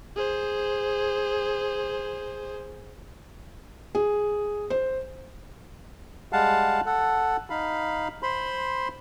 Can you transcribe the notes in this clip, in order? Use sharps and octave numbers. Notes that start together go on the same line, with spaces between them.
G#4 C5
G#4
C5
G3 G#3 F5 F#5 A5
A4 F#5
D#4 F5 B5
C5 B5 C6